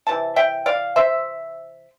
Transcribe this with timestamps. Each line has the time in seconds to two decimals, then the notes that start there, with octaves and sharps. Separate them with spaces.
0.07 C3 E3 A5
0.36 E5 G5
0.66 D5 F5
0.96 C5 E5